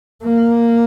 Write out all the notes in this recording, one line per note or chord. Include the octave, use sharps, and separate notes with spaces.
A#3